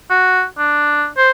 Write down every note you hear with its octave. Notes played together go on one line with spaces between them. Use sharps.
F#4
D4
C5